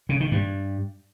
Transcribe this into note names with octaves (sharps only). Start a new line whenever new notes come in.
C#3
D#3
G2